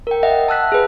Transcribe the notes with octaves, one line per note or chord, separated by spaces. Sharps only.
A#4 G5
D#5 E5 F#5
A5 E6 F#6 B6
G#4 B4